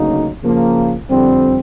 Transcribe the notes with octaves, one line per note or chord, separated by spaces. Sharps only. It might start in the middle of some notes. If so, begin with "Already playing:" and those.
Already playing: D2 C#3 F#3 A#3 D#4
C#3 F3 A#3
F2 D3 G3 C4